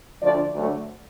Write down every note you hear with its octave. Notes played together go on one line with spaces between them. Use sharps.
D2 D3 F3 A3 D4 D5
D2 D3 F#3 A3